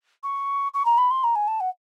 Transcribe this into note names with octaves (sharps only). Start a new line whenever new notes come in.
C#6
C#6
A#5
B5
C6
A#5
G#5
A5
F#5